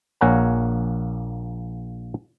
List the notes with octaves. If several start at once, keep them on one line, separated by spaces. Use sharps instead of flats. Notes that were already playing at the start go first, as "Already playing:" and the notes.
A#1 A#3 C#5 F#5 G#5 A#5